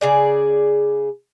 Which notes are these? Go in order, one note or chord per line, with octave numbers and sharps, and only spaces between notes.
C#3 G#4 D5